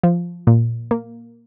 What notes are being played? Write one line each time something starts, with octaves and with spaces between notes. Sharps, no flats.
F3
A#2
A#3